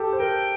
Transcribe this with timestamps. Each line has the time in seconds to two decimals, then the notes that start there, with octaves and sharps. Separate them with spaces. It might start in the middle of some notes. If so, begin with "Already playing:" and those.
Already playing: G4 A4
0.13 C5
0.19 A#4 G5